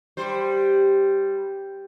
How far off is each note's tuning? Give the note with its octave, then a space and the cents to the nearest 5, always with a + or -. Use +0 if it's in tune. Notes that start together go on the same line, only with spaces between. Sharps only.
G3 +0 C5 +0